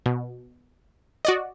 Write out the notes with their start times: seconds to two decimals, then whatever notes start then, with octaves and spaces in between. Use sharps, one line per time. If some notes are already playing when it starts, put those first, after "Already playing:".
0.06 B2
1.25 F#4 D5 D#5